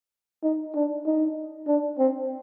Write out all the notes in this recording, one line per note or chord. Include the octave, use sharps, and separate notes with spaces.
D#4
D4
D#4
D4
C4